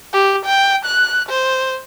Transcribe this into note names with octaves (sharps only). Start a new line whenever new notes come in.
G4
G5
F#6
C5